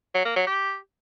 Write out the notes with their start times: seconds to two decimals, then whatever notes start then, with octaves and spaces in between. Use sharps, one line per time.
0.15 F#3
0.25 A#3
0.36 F#3
0.47 G4